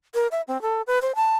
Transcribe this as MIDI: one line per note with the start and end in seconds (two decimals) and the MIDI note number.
0.14 0.27 70
0.32 0.41 76
0.48 0.60 60
0.62 0.82 69
0.87 0.99 71
1.02 1.12 72
1.15 1.37 81